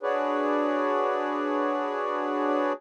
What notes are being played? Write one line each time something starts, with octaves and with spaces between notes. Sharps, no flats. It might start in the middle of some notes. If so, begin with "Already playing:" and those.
D4 F#4 G#4 B4 C#5 D5